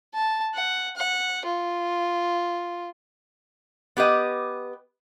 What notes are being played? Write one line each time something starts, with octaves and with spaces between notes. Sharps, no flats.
A5
F#5
F#5
F4
B3 G4 B4 D#5